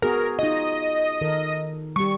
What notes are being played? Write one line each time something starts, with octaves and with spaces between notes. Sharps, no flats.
B3 F#4 G#4 A#4
D#4 F4 D#5
D#3 A4 A#4
G3 G4 C#6